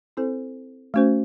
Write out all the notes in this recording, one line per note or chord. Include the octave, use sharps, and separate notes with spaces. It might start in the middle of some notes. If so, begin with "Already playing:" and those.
C4 E4 A4 C5
A3 C#4 F#4 C5